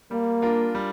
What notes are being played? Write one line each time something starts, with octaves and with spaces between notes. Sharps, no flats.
G3 A#3
D4 F4 A#4
G3